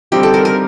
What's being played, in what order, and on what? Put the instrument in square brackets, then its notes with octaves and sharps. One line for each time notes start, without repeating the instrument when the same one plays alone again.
[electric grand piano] D3 G3 C4 D#4 [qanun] G4
[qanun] A4
A#4
A#4